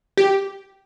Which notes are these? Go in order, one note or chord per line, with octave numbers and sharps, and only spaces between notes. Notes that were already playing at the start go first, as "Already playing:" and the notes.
G4